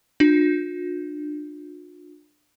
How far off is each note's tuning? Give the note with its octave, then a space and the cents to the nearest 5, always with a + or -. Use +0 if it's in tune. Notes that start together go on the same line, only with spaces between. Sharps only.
D4 +25 F4 +45